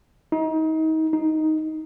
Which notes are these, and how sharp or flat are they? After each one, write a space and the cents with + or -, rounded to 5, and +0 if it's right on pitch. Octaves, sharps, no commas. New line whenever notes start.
D#4 +30
D#4 +5